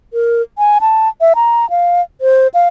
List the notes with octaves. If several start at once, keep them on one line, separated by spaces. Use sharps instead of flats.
A#4
G#5
A5
E5
A#5
F5
C5
F5